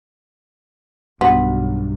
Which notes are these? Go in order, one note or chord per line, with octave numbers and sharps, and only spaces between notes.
B1 G2 B3 F#4